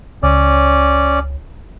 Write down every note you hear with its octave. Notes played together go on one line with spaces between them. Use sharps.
C#2 C#4 D5